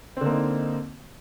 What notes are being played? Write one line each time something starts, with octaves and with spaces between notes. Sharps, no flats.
D3 A#3 C4 D#4